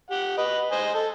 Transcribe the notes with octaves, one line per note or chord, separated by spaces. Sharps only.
G4 F#5
B4 D#5
C5 D#5 G#5
A4